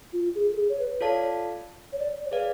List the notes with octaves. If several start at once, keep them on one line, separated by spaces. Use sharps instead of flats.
F4
G#4
A4
G#4
C#5
B4
F4 A4 C#5 D5 F5 A5
C#5
D5
C#5
G#4 B4 D5 F5